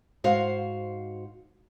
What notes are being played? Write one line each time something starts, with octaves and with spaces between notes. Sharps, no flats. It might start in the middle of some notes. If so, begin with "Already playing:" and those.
G#2 F#4 C5 F5